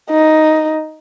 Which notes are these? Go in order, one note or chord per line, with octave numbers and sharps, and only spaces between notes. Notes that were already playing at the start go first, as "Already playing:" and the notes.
D#4